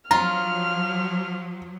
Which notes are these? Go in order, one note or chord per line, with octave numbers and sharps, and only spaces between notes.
F3 F#3 F4 A#5 F6